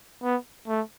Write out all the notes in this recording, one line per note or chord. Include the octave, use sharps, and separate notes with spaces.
B3
A3